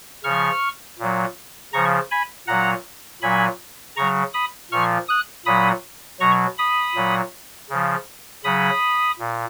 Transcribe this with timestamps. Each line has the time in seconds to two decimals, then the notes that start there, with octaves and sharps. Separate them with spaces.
0.24 C#3 F3 C#6 F6
0.99 A#2 F#3
1.73 C#3 F3 A#5 C#6
2.11 G#5 B5
2.47 A#2 F#3 F#5 A#5
3.22 A#2 F#3 G#5 B5
3.96 C#3 F#3 A#5 C#6
4.34 B5 D#6
4.71 A#2 F3 C#6 F6
5.08 D#6 F#6
5.46 A#2 F#3 B5 D#6
6.20 B2 F#3 A#5 C#6
6.58 B5 D#6
6.95 A#2 F#3
7.69 C#3 F3
8.44 C#3 F#3 B5 D#6
9.19 A#2